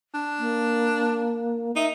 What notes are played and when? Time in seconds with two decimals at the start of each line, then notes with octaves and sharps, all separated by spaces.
0.14 D4
0.39 A#3
1.76 D#4 E5